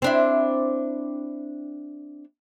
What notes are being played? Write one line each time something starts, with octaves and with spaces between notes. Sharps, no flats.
C4 D4 E4